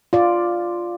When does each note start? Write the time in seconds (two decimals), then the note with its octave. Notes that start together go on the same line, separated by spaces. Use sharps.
0.13 F4 D5